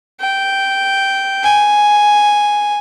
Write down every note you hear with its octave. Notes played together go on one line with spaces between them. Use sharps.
G5
G#5